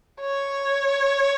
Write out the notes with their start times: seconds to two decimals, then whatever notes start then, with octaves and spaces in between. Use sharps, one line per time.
0.21 C#5